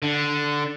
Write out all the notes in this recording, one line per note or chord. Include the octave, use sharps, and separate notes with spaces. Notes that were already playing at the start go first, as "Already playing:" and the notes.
D3